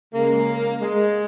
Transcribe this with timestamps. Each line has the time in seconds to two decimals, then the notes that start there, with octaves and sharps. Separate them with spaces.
0.13 C#3 G#3 A#3
0.80 G#3